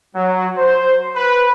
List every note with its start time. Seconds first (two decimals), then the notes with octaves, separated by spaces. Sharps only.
0.16 F#3
0.58 C5
1.16 B4